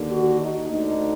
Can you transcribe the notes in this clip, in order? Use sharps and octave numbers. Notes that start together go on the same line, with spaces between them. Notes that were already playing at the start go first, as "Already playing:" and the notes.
Already playing: D#2 D3
F#4
D#4
D2 D3 D#4